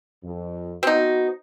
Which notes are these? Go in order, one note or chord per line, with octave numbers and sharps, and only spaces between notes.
F2
B3 C4 D#4 F#4